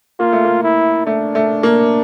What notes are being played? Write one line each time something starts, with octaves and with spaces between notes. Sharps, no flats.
A#3 F4
A3
A#3
E4
A3 D4
A3
A#3